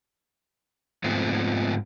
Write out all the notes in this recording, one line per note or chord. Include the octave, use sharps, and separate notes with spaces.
G#2 F3 A3 B3 C4